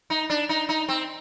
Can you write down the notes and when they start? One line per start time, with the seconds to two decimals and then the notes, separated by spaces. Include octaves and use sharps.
0.10 D#4
0.30 D4
0.49 D#4
0.69 D#4
0.89 C4